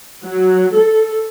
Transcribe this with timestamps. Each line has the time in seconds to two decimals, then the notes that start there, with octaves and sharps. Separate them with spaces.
0.24 F#3
0.77 A4